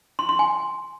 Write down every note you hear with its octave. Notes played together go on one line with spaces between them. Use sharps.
C6
C6
G#5